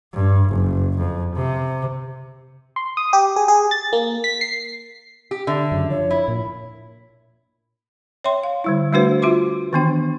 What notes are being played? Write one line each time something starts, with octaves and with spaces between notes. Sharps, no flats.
G2
F#1
F2
C3
C6
D#6
G4
G#4
G#4
A6
A#3
B6
C7
G4
D3 E5
F#2 C#3
F3 C#5
E4
A#2
C#5 E5 G5 C6
F5
D3 G3 E4
G3 A3 D4 F#4 B4 C5
F4 F#4 E5 C6 D6
D#3 E3 B3 D4 G5